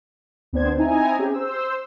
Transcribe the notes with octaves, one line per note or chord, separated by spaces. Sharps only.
D2 B3 C4 D4 C5 G#6
C4 D#4 E4 G#5 A#5
C#4 G4 G#4
C5 E6